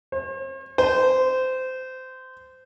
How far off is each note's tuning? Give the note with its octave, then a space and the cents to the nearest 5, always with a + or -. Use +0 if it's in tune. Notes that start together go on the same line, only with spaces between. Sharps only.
C5 +45
C5 -20